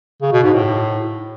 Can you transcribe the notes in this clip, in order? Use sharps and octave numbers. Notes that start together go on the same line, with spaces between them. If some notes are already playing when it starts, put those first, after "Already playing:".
C#3
B2
G#2
A2